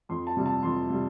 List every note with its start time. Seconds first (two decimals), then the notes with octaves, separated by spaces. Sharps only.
0.09 F2 C6
0.27 A5
0.37 C3 G3
0.46 A5
0.63 F2 C6
0.90 C3 G3